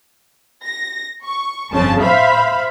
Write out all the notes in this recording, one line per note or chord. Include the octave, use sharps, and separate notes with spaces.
A#6
C#6
G1 F2 C#3 A5
C5 E5 F5 B5